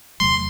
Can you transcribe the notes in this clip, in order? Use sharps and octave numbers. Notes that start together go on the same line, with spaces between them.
E2 C3 F#3 A3 C6